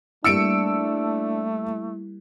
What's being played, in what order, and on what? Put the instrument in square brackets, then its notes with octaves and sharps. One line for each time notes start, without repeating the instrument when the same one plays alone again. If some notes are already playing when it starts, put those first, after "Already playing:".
[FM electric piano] G3 A#3 E4 [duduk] A3 [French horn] D4 [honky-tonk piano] E6 C#7 D7